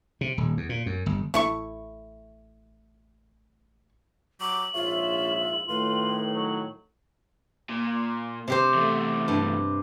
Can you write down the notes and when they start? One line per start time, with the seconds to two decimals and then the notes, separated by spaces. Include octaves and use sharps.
0.21 C3
0.37 D#1
0.57 E2
0.69 A#2
0.86 F#2
1.06 G1
1.34 A1 A3 E4 C#6
4.41 F#3 D6 F#7
4.74 A#1 G#2 F4 C#5 E5
5.68 A2 D#3 F4 B4
6.33 F#3
7.69 A#2
8.48 C3 G4 C5
8.74 E2 A3
9.28 G2